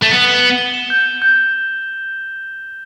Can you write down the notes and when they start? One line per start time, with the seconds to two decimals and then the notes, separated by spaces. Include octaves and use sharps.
0.03 A3
0.11 B3 G7
0.27 E7
0.43 G7
0.58 G7
0.74 E7
0.90 G6
1.06 G6
1.22 G6